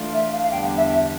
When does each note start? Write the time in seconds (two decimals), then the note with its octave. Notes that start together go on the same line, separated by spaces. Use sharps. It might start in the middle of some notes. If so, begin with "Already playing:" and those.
Already playing: E3 A3 D4 F4
0.13 E5
0.32 F5
0.42 F5
0.51 E2 D3 G3 B3 D4 G5
0.77 E5
0.89 E5